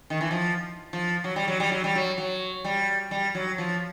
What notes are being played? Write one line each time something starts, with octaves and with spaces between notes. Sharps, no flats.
D#3
E3
F3
F3
F#3
G3
F#3
G3
F#3
G3
F#3
F#3
G3
G3
F#3
F3